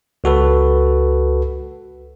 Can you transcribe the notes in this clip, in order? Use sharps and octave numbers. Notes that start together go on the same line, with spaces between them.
C#2 F#4 A4 B4